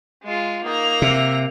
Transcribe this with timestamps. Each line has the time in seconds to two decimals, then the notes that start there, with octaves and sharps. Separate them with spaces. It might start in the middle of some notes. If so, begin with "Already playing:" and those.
0.23 G#3 F4
0.64 A#3 D#4 A#5
1.02 C3 E5